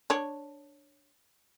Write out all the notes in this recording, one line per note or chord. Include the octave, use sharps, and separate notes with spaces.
D4 C#5